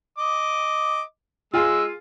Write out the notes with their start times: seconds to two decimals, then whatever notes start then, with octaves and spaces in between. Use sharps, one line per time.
0.18 D#5 D6
1.54 G#3 F4 G#4 E6